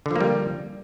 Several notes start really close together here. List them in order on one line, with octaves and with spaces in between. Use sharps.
D3 F3 A#3 G3